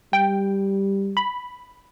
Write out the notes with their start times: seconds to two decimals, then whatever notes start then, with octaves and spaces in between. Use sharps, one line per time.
0.13 G3 G5
1.17 B5